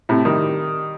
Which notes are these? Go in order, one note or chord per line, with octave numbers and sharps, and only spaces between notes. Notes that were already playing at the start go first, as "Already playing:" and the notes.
A2 C3
D#3 G3